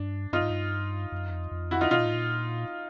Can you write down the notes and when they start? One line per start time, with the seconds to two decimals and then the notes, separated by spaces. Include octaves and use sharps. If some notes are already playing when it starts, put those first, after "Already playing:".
Already playing: G2 D4
0.33 G2 D#4 F4
0.41 G#2
0.50 G2
1.12 F#2
1.31 F2
1.51 F2
1.71 E4 F#4
1.81 D#4 F4
1.91 B2 D#4 F4
1.98 A#2
2.05 A2
2.14 A#2